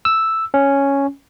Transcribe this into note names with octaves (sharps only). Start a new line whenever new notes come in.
E6
C#4